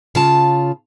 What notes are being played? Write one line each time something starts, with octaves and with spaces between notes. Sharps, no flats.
C#3 F4 A5